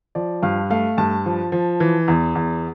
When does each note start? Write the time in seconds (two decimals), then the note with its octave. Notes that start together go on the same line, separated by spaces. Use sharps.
0.15 F3 D5
0.43 G2 F5
0.70 A3 F5
0.98 G2 A5
1.26 F3
1.52 F3
1.80 E3
2.08 E2
2.35 E2